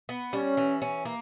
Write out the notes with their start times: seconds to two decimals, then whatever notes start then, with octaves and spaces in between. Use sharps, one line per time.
0.09 B3
0.33 G3 C#4
0.57 E3
0.82 C#4
1.05 A#3